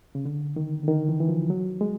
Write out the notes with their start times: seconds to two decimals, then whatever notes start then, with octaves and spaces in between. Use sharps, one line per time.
0.15 C#3
0.25 D3
0.56 D#3
0.83 D3
0.88 D#3
1.09 E3
1.20 E3
1.29 F3
1.50 F#3
1.81 G#3